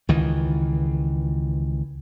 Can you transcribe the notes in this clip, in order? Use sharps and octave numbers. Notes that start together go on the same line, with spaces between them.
C#2 D#3 E3